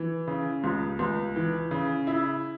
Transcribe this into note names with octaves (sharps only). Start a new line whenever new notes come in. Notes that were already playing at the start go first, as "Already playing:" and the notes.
Already playing: E3
C#3
C#2
C#2
E3
C#3
E4